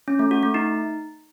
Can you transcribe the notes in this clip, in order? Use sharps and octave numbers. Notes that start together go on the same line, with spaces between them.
C#4
A3
F#4
A3
D#4